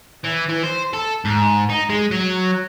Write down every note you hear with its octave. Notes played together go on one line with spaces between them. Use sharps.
E3
E3
C5
A4
G#2
D#4
G#3
F#3